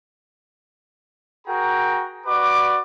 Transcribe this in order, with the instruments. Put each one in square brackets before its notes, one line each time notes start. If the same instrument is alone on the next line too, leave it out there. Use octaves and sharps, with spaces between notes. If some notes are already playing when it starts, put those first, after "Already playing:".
[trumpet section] F#4 G#4 A#4 G5 A#5
F#4 B4 D5 D6